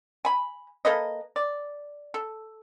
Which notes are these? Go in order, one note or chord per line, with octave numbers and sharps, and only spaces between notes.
G#5 B5
A#3 A4 B4 D#5
D5
A4